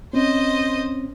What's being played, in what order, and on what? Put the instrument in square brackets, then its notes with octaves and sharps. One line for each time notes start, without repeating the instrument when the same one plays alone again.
[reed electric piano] C4 C#4 [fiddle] C5 D#5